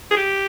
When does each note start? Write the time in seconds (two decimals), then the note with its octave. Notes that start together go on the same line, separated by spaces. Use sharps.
0.11 G#4
0.17 G4